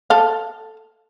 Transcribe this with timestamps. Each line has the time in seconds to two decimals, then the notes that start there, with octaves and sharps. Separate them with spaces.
0.10 A4 F5